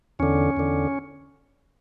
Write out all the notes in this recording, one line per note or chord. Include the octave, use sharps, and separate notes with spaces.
E2 D3 C#4
E2 D3